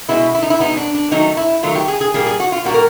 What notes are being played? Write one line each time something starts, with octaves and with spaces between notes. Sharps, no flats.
B2 G#3 B3 E4
E4
D#4
E4
B2 G#3 B3 D#4
D4
D4
D#3 F#3 A3 D#4
E4
D#3 F#3 A3 F4
G4
G#4
G#4
A#2 G3 A#3 G#4
G#4
F#4
F4
A#2 G3 A#3 F#4
A#4